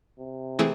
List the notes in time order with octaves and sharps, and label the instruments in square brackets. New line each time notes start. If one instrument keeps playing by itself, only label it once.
[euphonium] C3
[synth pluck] E3 A3 C4 E4 G#4